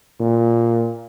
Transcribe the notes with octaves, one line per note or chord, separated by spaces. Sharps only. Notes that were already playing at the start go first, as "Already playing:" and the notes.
A#2